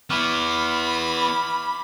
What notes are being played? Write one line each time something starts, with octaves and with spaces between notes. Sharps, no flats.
B3 E4 B5 C#6 D6 F6